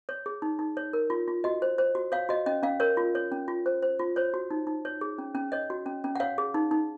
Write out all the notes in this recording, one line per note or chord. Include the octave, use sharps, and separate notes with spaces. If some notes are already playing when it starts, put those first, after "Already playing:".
C#5
G#4
D#4
D#4
C#5
A#4
F4
F4
F#4 D#5
C5
C5
F#4
C#5 F5
F#4 D#5
C#4 D#5
C#4 F5
A#4 C#5
F4
C#5
C#4
F4
C5
C5
F4
C5 C#5
F#4
D#4
D#4
C#5
G#4
C#4
C#4
C#5 D#5
F#4
C#4
C#4
F#5
C#5 F5
G#4
D#4
D#4